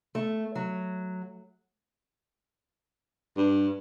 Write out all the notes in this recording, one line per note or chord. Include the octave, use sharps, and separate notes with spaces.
A3
F#3
G2